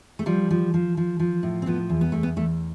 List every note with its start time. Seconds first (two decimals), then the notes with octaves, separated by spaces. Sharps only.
0.19 A3
0.26 F3 G3
0.50 F3
0.74 F3
0.97 F3
1.19 F3
1.43 A2
1.62 C4
1.66 F3 B3
1.89 E2
2.01 B3
2.12 E2 A3
2.23 B3
2.36 E2 A3